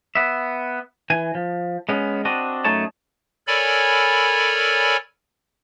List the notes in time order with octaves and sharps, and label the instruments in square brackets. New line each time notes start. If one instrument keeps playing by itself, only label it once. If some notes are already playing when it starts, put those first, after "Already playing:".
[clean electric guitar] B3 E5
E3 G#5
F3
G#3 B3 C#4
C4 D4 F#4 D#5
F#2 A3 D#4 C#5 A5
[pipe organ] A4 A#4 C#5 D5 G#5 B5